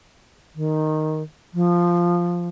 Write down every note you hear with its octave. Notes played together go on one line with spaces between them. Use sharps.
D#3
F3